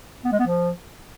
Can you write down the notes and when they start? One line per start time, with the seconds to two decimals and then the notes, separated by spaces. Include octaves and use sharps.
0.24 B3
0.32 G#3
0.39 B3
0.47 F3